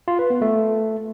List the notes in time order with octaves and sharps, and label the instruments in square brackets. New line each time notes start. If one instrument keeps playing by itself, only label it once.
[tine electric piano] F4
B4
B3
A3